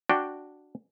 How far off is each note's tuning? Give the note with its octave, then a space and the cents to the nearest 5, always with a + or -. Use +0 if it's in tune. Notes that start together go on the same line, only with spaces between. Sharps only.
D4 +0 F#4 +0 G5 +0